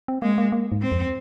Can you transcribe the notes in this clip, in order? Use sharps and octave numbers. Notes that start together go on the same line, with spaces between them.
C4
G#3 A#3
A#3
A#3
G#2
C4
F2